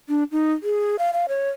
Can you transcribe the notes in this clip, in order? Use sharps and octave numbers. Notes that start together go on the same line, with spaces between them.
D4
D#4
G#4
F5
F5
C#5